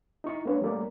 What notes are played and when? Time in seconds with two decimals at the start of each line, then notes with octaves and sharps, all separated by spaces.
0.24 D#4 E4 C#6
0.45 A#3 C#4 D4 B4 C#5
0.62 G3 A3 A#3 C#4 A#4 D5